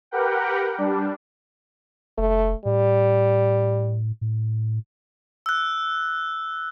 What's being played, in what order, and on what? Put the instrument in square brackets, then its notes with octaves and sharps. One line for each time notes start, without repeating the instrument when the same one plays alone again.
[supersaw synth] G4 A#4 B4 F#5 G5
G3 D4
[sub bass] F1 [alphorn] A3
[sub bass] A2 [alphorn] G3
[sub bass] A2
[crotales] E6 F#6